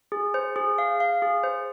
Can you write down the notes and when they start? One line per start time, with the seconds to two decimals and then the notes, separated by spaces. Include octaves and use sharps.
0.12 G#4
0.34 C5
0.56 G#4
0.78 F5
1.00 F5
1.22 G#4
1.44 C5